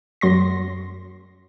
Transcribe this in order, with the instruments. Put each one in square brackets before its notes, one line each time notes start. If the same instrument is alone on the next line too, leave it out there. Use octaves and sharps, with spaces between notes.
[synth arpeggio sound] F#2 C6 A#6